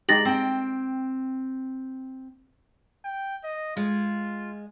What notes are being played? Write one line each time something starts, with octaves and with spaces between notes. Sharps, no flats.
G#3 D#4 G4 A6 A#6 F#7
C4 G5
G5
D#5
G#3 F4